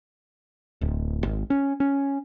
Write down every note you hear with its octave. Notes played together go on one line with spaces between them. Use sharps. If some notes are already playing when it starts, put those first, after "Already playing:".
D1
G#1
C#4
C#4